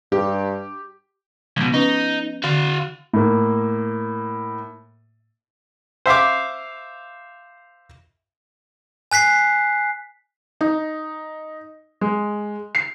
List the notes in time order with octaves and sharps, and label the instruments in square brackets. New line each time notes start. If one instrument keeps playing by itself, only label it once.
[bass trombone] G2 [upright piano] G4
[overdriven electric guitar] C#2 B2 [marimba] F3 B3
[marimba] C#4 B4 [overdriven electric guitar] D#4
[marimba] D3 [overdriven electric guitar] F#4 F5
[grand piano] A2 A#3
[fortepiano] C5 E5 F5 D6
[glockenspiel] G#5 F#6 B6 C7
[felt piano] D#4
G#3
C7